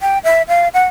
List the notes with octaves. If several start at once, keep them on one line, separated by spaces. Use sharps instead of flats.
G5
E5
F5
F#5